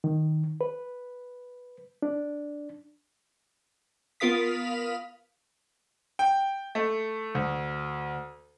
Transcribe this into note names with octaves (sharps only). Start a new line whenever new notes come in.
D#3
B4
D4
B3 F4 A#4 F5 D#6 B6
G5
A3
D2